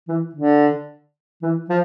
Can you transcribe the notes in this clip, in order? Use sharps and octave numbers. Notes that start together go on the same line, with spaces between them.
E3
D3
E3
F3